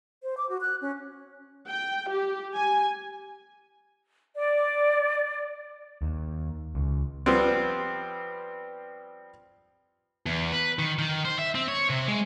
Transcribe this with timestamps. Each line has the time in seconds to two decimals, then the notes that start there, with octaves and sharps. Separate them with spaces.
0.23 C5
0.37 D6
0.49 F#4
0.61 F#6
0.81 C#4
1.68 G5
2.10 G4
2.55 G#5
4.35 D5
6.02 D#2
6.75 C#2
7.26 F3 G3 B3 C4
10.26 E2
10.53 B4
10.79 D#3
10.99 D#3
11.25 C5
11.39 E5
11.55 C4
11.68 C#5
11.90 C3
12.08 G#3